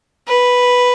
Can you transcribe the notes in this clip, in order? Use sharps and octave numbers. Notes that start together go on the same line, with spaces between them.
B4